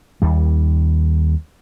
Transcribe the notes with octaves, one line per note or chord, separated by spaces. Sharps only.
D#2 G3